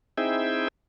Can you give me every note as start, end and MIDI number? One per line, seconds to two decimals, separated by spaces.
0.18 0.68 60
0.18 0.68 63
0.18 0.68 64
0.18 0.68 68
0.18 0.68 76
0.18 0.68 79